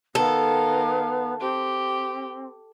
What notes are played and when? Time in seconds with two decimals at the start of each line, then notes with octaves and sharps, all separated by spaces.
0.15 D#3 B3 A4 F5
1.40 C4 G4